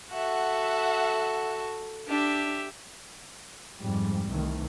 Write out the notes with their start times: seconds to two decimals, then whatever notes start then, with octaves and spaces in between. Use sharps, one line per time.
0.12 F#4 A4 E5 F#5
2.07 D4 G4 E5
3.79 F2 G#2 G3
4.28 C2 D#3 E3 A3